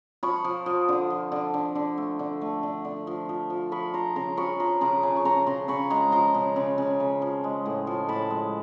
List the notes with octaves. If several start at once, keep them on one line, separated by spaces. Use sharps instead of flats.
F3 B5 C#6
F3
F3
D3
F3
D3
D3
D3
A3
D3
A3
D3
D3
F3
F3
F3
F3 B5 C#6
F3 A#5 C6
C#3 A#5 C6
F3 B5 C#6
F3 A#5 C6
C#3 A#5 C6
C#3
C#6
C#3 A#5 C6
C#3 A#5 C6
C#3 B5 C#6
G#3 A#5 C6
F3 A#5 C6
C#3
C#3
C#3
C#3
F3
G#3
A2
F3
A2 A5 B5
G#3